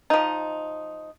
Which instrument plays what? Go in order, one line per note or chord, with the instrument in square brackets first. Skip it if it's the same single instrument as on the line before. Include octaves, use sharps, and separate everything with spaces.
[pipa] F3 D#4